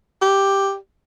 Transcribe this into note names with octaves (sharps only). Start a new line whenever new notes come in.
G4